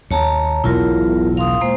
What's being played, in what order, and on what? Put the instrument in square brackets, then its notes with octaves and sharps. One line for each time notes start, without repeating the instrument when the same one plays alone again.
[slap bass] D#2 [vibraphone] C#5 A5 A#5
[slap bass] E1 B1 A2 [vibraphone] E4 F4 A#4
[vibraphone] F5 C6 D#6
G#3 A#3 C5